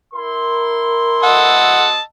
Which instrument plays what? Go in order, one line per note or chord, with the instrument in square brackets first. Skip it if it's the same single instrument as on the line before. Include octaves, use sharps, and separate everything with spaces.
[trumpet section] E4 C6 [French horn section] A#4
[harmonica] D#5 A5 E6 [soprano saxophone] F#5